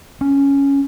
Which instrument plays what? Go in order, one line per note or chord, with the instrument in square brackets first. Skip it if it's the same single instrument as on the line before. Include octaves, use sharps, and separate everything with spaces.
[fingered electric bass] C#4